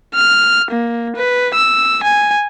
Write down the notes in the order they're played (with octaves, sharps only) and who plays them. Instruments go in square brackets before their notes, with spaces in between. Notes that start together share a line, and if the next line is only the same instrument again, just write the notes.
[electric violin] F6
A#3
B4
E6
G#5